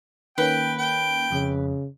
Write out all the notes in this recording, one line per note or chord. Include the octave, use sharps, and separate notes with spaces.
D#3 A#3 C#4 B4 G5
G5
F2 C#3